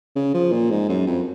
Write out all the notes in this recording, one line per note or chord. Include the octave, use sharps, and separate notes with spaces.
C#3
F3
A#2
G#2
F#2
F2